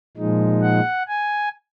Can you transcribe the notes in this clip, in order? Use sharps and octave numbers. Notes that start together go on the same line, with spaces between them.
A#2 F3 G#3 D#4
F#5
G#5